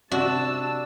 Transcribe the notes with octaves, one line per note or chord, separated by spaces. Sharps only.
C3 D4 F#4 A5 E6